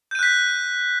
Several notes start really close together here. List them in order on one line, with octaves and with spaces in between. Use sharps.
G6 D#7 F#6 B6